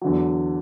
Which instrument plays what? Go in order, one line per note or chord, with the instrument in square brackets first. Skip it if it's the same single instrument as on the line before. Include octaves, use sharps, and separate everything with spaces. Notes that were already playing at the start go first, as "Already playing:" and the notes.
[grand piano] E2 D3 F#3